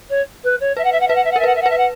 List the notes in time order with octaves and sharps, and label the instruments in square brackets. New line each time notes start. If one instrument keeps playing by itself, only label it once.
[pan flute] C#5
B4
C#5
[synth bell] B4 [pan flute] E5
[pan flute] F#5
E5
F#5
[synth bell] B4 [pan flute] E5
[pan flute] F#5
E5
F#5
[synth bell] A#4
[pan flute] E5
[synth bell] B4 [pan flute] F#5
[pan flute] E5
F#5
[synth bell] B4
[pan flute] E5
F#5